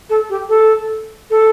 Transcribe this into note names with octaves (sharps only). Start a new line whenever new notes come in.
A4
G4
A4
A4